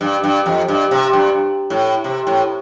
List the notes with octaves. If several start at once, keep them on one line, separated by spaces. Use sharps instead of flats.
G2
G2
F2
G2
C3
G2
A2
C3
A2